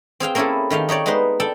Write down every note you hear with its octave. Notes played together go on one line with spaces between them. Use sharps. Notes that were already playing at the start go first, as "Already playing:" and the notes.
C4 G#4 F5 G5
A#3 C4 C#4 E4 G#4 A4
D#3 A3 G4 F5
D#4 G4 C#5 D5
G#3 B3 D#4 B4 C5
A4 D5 G5 A5